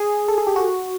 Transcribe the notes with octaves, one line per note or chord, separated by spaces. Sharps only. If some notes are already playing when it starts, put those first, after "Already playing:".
Already playing: G#4
A4
G#4
G4
F#4